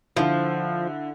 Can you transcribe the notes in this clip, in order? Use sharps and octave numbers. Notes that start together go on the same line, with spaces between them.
D3 F3 E4